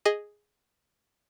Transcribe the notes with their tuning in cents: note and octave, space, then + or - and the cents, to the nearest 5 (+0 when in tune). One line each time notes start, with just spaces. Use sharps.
G#4 +0 D#5 +0